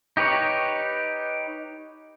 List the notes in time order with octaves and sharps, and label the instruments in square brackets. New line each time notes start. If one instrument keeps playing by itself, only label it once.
[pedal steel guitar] D#4 G4 B4 C#5